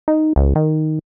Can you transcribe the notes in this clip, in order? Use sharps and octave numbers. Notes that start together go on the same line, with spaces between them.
D#4
C#2
D#3